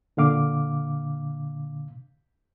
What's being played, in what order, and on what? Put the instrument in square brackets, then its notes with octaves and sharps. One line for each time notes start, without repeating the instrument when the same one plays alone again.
[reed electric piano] A#2 D3 F5 D6